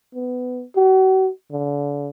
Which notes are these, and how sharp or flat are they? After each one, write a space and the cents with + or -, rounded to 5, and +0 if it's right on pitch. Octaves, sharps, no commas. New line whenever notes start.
B3 +20
F#4 +40
D3 -35